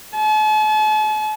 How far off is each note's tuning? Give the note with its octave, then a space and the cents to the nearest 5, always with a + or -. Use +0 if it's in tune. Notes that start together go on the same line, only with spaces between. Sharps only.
A5 -45